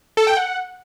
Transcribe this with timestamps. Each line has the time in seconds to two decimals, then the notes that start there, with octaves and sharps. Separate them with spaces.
0.17 A4
0.27 G5
0.37 F#5